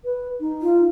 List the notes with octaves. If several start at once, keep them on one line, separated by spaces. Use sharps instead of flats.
B4
D#4
F4